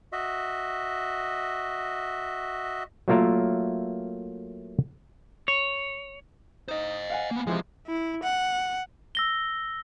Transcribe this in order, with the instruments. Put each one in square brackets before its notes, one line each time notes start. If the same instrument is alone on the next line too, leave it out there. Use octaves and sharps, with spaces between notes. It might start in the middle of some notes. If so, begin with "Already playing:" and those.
[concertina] F#4 D#5 E5
[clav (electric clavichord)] F#3 A3 A#3 F4 A#4 E5
[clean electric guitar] C#5
[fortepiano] D#4 [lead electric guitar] C5 D#5
[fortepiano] F5 F#5 G#5
[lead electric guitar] A#3 B3
[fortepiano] C3 E3 G#3 [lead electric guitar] F3
[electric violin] E4
F#5
[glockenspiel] E6 A#6 G7